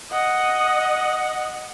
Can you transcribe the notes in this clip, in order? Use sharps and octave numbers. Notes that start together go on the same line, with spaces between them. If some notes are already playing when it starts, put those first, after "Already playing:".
D#5 F#5